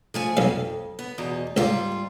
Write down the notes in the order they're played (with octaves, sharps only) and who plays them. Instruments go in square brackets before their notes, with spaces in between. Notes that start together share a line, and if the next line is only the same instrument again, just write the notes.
[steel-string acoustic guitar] F3 A3 G#5
[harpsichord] B1 F5 [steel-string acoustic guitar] F2
[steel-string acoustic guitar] B3
E2 B2 D#4
[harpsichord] C#2 [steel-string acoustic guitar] G#2 G3 F4